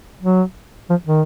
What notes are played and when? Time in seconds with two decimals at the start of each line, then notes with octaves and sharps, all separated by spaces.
0.22 F#3
0.90 F3
1.07 D#3